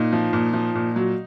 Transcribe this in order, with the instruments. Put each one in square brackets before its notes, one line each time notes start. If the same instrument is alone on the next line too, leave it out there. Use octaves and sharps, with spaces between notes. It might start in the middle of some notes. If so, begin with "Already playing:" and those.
Already playing: [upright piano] A#2 D#4
F3
A#2
F3
A#2
F#3